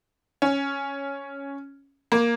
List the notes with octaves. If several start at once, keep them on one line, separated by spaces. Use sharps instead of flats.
C#4
A#3